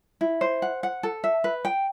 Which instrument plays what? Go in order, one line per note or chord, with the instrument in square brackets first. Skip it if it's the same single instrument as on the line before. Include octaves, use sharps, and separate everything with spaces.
[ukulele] E4
C5
F#5
F#5
A4
E5
B4
G5